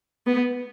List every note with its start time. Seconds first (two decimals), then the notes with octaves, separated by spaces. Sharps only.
0.27 B3